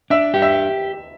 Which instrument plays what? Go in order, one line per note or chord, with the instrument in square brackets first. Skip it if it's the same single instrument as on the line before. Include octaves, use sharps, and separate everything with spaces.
[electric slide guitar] D4 [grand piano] E5
[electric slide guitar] G4
[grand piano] E5